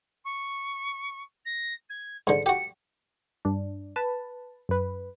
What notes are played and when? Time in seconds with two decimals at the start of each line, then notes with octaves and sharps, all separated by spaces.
0.24 C#6
1.45 A#6
1.89 G#6
2.27 G#2 D3 C#7
2.46 F#4 G4 C#7
3.45 G2 D4
3.96 B4 A5
4.69 F#2 B4